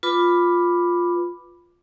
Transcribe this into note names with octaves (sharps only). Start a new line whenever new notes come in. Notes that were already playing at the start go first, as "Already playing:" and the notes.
F4 B4 B5 D6